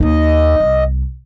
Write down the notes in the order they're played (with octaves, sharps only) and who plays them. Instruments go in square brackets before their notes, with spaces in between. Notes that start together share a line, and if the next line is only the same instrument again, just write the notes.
[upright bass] D#2 D#4 [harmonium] D#5
[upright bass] C2